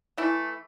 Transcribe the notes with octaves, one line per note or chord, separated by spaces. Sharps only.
E3 A3 E4